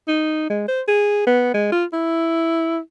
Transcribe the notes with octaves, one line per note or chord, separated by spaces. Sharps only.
D#4
G#3
C5
G#4
B3
G#3
F4
E4